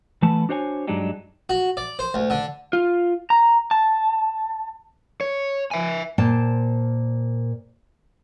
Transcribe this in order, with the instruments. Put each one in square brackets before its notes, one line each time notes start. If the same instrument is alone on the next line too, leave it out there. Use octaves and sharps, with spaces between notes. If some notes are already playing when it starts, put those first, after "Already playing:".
[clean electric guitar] E3 A3 B3 A5
D4 F#4 C5 C#5 F#5 G#5
G2 F#3 G#3 D4 D#4 G4
[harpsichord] F#4
D5
C5
D2
D3
[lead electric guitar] F4
A#5
A5
[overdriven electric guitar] C#5
E5 G#5
[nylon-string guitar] A#2 C5 G5 A5